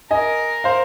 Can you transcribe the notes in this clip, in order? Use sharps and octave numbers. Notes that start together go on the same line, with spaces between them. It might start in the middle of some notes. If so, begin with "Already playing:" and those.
A#4 D#5 G#5
C5 F5